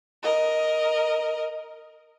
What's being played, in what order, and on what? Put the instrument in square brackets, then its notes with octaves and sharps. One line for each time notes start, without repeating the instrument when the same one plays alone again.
[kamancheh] A#4 D#5